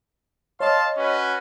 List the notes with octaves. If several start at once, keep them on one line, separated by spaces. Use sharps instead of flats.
C#5 D#5 F5 A5 C6
C#4 F#4 B4